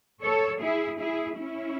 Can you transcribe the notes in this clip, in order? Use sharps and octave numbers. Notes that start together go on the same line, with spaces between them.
A4 C#5
E4 G#4
E4 G#4
C#4 E4